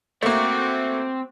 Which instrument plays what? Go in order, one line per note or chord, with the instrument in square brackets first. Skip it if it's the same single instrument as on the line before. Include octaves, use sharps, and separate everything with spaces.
[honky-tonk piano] A3 A#3 [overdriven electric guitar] C4 [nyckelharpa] F#4 D6